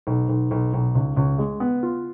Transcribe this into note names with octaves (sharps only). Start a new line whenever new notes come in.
B1
B1
B1
B1
C#2
C#2
G#3
B3
F4